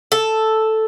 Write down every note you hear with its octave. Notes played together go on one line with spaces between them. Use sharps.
A4